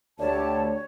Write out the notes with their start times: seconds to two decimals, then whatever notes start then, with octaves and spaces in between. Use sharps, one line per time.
0.20 D2 G4 C#5 D5 A5